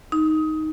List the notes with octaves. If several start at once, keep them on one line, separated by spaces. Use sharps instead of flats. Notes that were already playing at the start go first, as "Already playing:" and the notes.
D#4